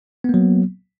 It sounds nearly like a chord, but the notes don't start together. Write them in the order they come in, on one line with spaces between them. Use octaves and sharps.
B3 A#3 F#3